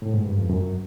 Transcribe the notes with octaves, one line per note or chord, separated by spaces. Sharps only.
A2
G#2
G2
F2
F#2